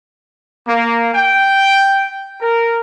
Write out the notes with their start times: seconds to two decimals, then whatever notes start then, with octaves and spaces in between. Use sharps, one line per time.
0.66 A#3
1.14 G5
2.41 A#4